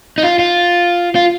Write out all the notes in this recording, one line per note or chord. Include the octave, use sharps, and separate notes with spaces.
D#4
F4
F4
F4